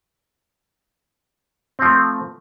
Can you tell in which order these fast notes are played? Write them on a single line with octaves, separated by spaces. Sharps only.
C4 F3 A3